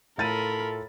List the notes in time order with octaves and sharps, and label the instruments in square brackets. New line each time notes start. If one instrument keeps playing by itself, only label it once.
[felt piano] A2 A6 D#7 [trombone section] F4 A4 [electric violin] A#4 B5